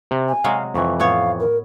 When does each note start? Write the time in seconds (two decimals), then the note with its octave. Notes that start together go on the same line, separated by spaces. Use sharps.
0.11 C3
0.28 G#5
0.44 C3 F#3 G#3 F5
0.74 F2 E3 C#6
1.00 A2 B3 C#5 F5
1.39 A#4